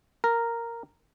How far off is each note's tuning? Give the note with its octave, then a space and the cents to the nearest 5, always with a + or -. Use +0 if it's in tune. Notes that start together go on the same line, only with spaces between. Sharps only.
A#4 -5